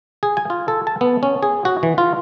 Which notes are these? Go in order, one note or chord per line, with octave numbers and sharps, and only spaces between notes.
G#4
G#5
F4
A4
A5
B3
C#4
G#4
F#4
E3
F4